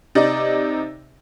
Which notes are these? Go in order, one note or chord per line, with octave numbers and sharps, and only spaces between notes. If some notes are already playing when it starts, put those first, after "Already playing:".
C3 D#4 D5